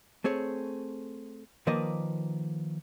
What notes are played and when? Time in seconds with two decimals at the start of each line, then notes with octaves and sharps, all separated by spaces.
0.24 A3 C4 G#4 C#5
1.67 D#3 F3 A#3 B4 D5 D#5